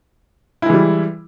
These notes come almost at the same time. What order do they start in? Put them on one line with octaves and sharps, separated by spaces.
E4 G#3 E3 G3